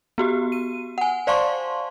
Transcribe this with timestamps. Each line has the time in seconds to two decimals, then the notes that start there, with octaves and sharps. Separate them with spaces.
0.18 B3 F#4 G4
0.52 D#7
0.98 F#5 G#5
1.27 C5 D5 F5 A5 C6 C#6